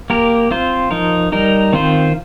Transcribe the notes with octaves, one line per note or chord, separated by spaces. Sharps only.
A#3 G4 A#4
C4 F4 C5
F3 D#4 A#4
G3 D#4 A#4
D#3 C4 F4 C5